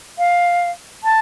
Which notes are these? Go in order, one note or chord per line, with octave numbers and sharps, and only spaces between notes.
F5
A5